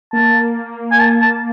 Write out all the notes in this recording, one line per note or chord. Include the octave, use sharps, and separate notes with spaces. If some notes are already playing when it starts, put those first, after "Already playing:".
A#3 A5
G#5
A5
A5